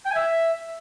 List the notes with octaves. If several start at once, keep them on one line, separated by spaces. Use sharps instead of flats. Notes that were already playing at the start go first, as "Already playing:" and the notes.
G5
G#5
E5